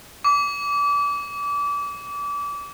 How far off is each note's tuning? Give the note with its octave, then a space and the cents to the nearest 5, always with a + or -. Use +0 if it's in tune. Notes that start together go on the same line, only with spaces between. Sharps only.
D6 -30